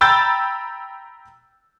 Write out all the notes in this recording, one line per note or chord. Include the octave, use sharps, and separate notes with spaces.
G5 A#5 B5 E6 G6 A6